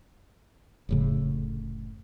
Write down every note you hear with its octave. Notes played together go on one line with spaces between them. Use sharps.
F1 A2 C#3